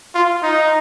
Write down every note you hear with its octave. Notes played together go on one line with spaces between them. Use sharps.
F4
D#4